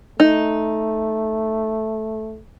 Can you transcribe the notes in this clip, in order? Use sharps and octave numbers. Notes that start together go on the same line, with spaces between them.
A3 D#4